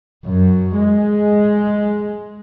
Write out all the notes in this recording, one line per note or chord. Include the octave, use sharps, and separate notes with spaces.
F#2
G#3